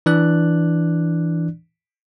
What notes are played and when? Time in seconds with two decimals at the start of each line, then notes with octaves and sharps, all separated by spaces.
0.06 E3 D4 D5 F#6